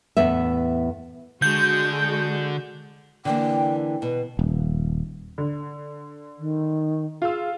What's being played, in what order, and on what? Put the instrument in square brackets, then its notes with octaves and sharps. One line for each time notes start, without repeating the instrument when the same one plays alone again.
[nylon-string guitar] E2 A2 B3 E5
[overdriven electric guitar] D3 [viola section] G#3 F#4 [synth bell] G6
[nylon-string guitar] D3 E3 A#3 [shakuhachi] G5
[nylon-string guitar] B2 [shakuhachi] B4
[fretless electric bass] D#1
[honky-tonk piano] D3
[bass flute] D#3
[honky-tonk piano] F4 E6 [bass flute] G#4